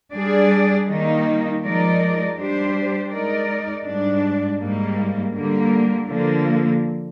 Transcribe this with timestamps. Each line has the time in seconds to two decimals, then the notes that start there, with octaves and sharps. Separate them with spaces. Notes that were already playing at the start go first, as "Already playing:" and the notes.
0.14 G3 D4 G#4 D5
0.88 D#3 G3 A#3 D#4
1.62 F3 G#3 D#4 A#4 D5
2.36 G3 D4 G4 C5
3.11 G#3 D#4 A#4 D5
3.85 G#2 G3 D4
4.59 G#2 G3 A#3
5.34 D3 G3 A#3
6.08 D3 F3 A#3